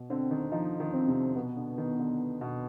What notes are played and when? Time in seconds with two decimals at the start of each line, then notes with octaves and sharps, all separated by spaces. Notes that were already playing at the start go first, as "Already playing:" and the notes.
Already playing: B2
0.10 D3 C4
0.31 D#3
0.52 F3 D#4
0.80 D#3
0.94 C4
1.08 C3
1.36 B2 B3
1.57 D3
1.78 D#3
1.99 D3
2.41 B2